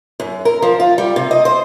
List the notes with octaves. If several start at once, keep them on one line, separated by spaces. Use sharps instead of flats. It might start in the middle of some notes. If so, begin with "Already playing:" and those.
F#2
A#4
F3
F4
G3
C3
D#5
C5